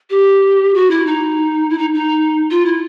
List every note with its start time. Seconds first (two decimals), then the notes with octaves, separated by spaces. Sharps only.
0.10 G4
0.74 F#4
0.90 E4
1.06 D#4
1.70 E4
1.78 D#4
1.94 D#4
2.51 F4
2.66 E4